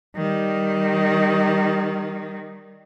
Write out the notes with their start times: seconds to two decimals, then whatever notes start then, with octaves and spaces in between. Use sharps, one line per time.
0.16 D#3 G3